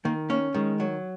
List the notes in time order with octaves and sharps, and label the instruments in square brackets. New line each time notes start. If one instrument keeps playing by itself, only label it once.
[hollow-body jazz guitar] D#3 [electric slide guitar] A#3
[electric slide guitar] A#3 [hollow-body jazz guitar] C#4
[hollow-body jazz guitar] D#3 [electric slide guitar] G#3
[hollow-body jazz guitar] F#3